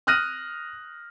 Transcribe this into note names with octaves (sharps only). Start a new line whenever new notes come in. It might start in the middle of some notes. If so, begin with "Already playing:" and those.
D#6 F6 F#6 A#6 D#7